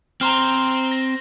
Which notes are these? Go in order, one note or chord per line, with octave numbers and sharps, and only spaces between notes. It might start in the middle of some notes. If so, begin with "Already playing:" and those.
C4 A#5 C6 F6
A#6